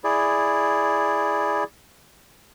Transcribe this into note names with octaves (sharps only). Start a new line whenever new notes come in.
E4 G#4 D5